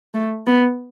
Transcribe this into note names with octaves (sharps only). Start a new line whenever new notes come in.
A3
B3